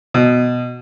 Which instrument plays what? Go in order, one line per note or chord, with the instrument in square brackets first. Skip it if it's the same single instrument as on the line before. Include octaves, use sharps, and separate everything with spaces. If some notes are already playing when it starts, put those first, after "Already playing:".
[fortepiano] B2